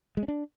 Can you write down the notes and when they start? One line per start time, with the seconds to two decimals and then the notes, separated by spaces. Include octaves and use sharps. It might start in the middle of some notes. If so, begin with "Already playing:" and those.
0.17 G#3
0.23 C#4
0.28 D4